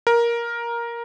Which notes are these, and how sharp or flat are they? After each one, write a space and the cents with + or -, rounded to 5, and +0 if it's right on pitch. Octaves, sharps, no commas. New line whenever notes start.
A#4 +10